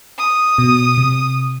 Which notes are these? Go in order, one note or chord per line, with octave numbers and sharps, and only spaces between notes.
D#6
B2
C3